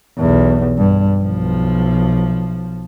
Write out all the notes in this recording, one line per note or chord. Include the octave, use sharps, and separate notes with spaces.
B1 E2
G2
B1 F3